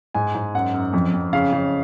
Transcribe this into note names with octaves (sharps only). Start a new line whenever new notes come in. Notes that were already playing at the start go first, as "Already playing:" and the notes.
G#2 G#5
G#2
F#2 F#5
F#2
F2
F2
C#3 F5
C#3